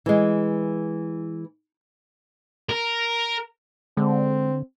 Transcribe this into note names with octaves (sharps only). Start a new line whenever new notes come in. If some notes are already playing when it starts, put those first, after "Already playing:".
E3 G#3
A#4
D3 G#3 C4